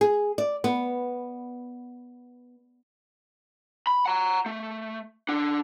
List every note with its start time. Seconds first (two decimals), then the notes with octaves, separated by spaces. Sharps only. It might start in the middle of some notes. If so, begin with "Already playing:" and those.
0.01 G#4
0.38 D5
0.64 B3
3.87 B5
4.06 F#5 A#5
4.46 A3
5.29 D4 F#5